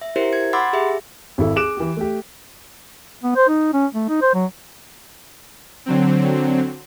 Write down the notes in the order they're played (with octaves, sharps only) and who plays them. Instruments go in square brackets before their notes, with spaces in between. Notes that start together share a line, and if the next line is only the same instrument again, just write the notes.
[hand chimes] E5
E4 F#4 G4 A#4 C5 E5
G#6 C#7
F#5 B5 C6 D6 E6 A6
G4 G#4 E5
[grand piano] G#1 E4 A4
G#4 D6 F#6 D7 E7
E3 G4
A3 G4
[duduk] B3
C5
D#4
C#4
A3
D#4
C5
F#3
[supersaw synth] D3 F#3 C4